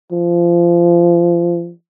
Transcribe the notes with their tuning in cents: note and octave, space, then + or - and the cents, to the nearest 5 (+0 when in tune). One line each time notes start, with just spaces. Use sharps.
F3 -25